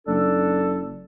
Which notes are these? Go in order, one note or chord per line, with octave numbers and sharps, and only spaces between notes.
F#1 D4 A4